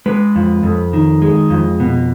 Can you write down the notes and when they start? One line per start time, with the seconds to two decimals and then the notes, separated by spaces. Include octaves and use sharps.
0.06 G#3 B4
0.36 F2
0.63 F2
0.93 D#3
1.22 G#3
1.50 F2
1.80 B2